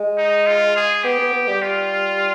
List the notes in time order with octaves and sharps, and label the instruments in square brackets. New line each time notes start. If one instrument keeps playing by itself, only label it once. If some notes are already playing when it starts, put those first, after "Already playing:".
Already playing: [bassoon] G#3
[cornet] D#4
F4
G#4
[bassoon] B3 [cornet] G4
[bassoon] B3
B3
G3
[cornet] F4